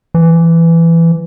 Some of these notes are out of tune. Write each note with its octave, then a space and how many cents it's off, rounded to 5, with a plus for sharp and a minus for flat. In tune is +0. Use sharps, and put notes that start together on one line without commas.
E3 +15